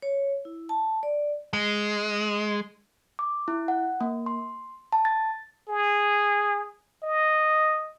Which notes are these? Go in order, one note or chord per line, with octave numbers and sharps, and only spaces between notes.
C#5
E4
A5
D5
G#3
D6
E4
F#5
A#3
C6
A5
A6
G#4
D#5